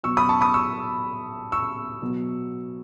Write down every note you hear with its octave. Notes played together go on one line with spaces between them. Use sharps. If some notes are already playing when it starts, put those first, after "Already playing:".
B2 F#3 C#6 E6
B5 D#6
A5 C#6
B5 D#6
C#6 E6
C#6 E6
B2 F#3